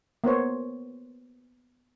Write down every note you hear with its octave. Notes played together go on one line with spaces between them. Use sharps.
A#3 B3 C5 C#5